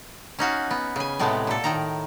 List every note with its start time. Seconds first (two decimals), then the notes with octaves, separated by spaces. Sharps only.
0.39 C#4 D#4 F#4 F5
0.71 B3
0.96 C#3 G#5
1.19 A2 C3 G#3 A3 B3
1.47 A#2 A4
1.64 A2 D#3 A#5